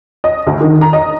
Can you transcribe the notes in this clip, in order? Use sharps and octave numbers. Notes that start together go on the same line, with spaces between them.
D#5
D2
D#3
A#5
D#5